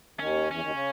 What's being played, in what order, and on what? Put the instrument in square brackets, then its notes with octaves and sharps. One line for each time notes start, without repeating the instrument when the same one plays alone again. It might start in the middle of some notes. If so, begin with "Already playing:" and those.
[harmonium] D#2 D#3 [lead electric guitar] C#4
[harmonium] E2 E3 [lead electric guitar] C#4
[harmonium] D#2 D#3
C#3